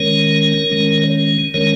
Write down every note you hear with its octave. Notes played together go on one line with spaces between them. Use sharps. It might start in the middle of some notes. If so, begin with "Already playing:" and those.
Already playing: D#3 G#3 C#4 A#4 C#5
D#3 G#3 C#4
D#3 G#3 C#4 A#4 C#5